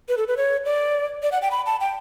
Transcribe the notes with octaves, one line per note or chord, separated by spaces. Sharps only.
B4
A4
B4
C#5
D5
D5
F#5
G5
B5
A5
G5